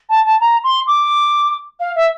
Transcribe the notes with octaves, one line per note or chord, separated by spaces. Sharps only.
A5
A5
A#5
C6
D6
F5
E5